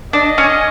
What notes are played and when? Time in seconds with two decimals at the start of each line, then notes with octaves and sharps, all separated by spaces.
0.13 D4 D#5
0.38 C#4